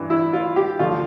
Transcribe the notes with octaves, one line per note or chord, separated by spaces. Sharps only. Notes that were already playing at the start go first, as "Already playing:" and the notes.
Already playing: G2 E3
E4
F4
G4
D2 D3 F3 F4